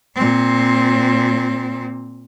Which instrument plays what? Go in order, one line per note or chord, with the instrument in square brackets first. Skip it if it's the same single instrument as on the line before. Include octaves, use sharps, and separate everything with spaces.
[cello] A#2 C4